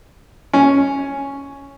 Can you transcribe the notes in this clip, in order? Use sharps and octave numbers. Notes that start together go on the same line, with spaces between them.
C#4